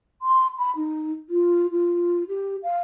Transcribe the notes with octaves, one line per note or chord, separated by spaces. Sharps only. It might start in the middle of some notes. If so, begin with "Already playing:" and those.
C6
B5
D#4
F4
F4
G4
F5